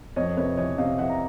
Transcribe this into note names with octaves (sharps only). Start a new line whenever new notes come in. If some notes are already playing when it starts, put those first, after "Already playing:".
F2 C#5 D#5
C3 B4 C#5
E3 C#5 D#5
C3 D#5 F5
E3 E5 F#5
A#5